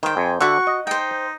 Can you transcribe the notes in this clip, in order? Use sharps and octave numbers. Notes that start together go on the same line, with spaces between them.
D#3 C5 G5
F2 G#5
D3 F#4 E5 F#5 C#6
D#5
D#4 C5 G5